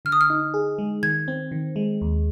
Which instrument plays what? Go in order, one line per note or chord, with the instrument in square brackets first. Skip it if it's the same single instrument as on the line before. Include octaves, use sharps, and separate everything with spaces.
[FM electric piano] D3 [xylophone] F6
[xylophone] D#6
F6
[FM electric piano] D#4
G#4
G#3
[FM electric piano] D#3 [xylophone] G#6
[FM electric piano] C4
D#3
G#3
D#2